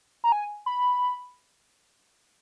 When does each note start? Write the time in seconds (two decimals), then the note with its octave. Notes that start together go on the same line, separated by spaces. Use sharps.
0.24 A#5
0.32 G#5
0.66 B5